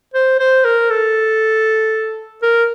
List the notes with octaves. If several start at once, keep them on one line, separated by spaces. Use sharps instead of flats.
C5
C5
A#4
A4
A#4